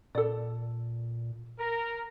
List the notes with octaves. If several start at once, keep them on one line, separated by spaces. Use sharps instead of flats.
A#2 A4 D5
A#4